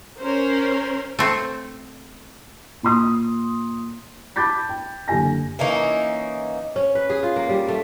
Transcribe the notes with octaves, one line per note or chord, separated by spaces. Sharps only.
C#4 A#4 C5
A3 C4
A#2 C6 D#6
A5 B5 D6 G6 A6 B6
G5
F#1 D3 G4 G#5 A#6
E3 A#3 C#4 D#4
C#4
B4
G#4
F4
A#3
G3
A3